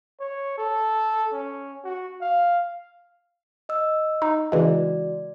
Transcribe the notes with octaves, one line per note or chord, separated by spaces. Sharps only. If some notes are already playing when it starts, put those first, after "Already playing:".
C#5
A4
C#4
F#4
F5
D#5 E6
D#4
C#3 E3 G#3 F#4 D5